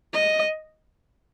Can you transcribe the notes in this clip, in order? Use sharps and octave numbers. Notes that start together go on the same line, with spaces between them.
D#5